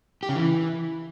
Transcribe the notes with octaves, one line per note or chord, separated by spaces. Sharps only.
G4
C#3
E3